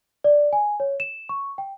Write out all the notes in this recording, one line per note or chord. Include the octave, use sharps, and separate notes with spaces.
D5
G#5
C#5
E7
C#6
G5